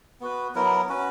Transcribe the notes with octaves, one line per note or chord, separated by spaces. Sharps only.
B3 F#4 B4
F#3 B3 E4 A#4
C#4 F#4 B4